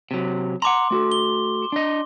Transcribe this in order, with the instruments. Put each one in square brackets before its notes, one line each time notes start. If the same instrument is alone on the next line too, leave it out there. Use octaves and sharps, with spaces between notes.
[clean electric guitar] C3 F#3
[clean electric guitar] F#5 A5 A#5 [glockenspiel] C6 D6
[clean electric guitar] A3 F#4 A4
[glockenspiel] G7
[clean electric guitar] D4 D#5